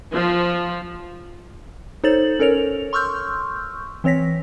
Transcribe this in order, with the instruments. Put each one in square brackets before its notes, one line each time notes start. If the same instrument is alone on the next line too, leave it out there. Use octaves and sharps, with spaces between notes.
[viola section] F3
[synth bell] D#4 A4 C5 C#5 A6 F#7
C#4 A4 A#4 C#5 F7
C6 C#6 E6 F6 G6
E3 C4 C#5 A#6 B6